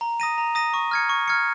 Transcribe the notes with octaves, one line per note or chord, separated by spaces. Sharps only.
A#5
D#6 A#6 D#7
A#5
D#6 A#6 D#7
C#6
F6 G#6 C#7
C#6
F6 G#6 C#7